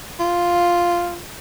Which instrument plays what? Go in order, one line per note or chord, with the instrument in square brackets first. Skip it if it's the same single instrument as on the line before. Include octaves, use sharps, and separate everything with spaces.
[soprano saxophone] F4